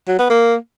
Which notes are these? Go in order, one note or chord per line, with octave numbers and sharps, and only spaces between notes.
F#3
B3
A#3